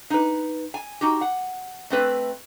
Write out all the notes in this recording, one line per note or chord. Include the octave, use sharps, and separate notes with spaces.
D#4 B4
G#5
D#4 F#4 G4
F#5
A3 C4 B4